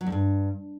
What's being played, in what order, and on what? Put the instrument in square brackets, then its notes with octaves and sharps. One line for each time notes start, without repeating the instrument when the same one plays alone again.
[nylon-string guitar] F#3
E2
G2